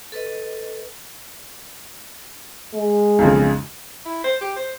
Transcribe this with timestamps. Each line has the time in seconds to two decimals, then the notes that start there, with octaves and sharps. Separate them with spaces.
0.12 A4 B4 D#5
2.75 G#3
3.19 B1 F2 C#3
4.05 E4
4.24 C5
4.41 G4
4.56 C5